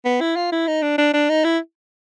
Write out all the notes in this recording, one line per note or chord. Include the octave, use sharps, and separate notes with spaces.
B3
E4
F4
E4
D#4
D4
D4
D4
D#4
E4